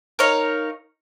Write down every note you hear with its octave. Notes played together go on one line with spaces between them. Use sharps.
D#4 A#4 C#5 F5